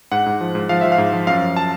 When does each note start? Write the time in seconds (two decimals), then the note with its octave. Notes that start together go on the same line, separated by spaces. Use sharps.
0.11 G#2 F#5
0.26 G#2
0.41 F3
0.55 G#2
0.69 F3 F5
0.81 F3 E5
0.92 F5
0.98 G#2
1.13 F3
1.27 F#2 F5
1.42 F3
1.56 A5